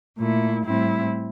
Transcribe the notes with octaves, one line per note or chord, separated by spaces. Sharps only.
A#2 A3 E4
A2 G3 C4 E4